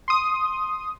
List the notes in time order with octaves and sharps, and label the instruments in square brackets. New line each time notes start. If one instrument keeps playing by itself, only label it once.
[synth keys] C6 D#6